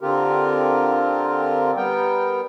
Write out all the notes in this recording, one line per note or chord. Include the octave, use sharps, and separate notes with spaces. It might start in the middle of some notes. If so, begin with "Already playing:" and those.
D3 C4 F4 G4 A#4
G3 B3 A#4 G5